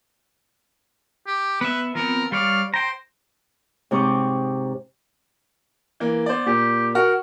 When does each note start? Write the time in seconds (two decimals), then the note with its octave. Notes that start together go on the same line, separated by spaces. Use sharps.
1.27 G4
1.61 B3 B4 E5
1.95 F3 B3 C4 A#4
2.32 G3 C#5 D5 F5
2.74 C5 G5 A#5
3.91 G#2 C3 C4 C#6 D6 G6
6.00 E3 A#3
6.26 B3 C5 D5
6.46 A#2 G4
6.95 F#4 A#4